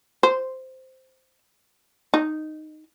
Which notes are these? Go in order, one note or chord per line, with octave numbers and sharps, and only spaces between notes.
C5
D#4